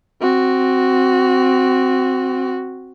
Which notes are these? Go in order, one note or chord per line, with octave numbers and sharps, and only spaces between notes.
C4 F#4